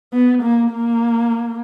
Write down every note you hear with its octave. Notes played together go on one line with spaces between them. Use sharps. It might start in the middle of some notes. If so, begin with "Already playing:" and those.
B3
A#3
A#3